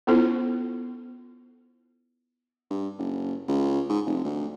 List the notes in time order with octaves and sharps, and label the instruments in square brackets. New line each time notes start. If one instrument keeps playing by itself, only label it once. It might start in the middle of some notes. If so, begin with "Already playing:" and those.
[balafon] B3 C#4 E4 F4 A4 C5
[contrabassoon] G2
F#1
C#2
G#2
F1
D2